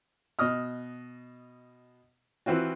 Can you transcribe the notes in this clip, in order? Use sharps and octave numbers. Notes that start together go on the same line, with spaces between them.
B2 D#5 D#6 F6
E3 C4 F4 F#4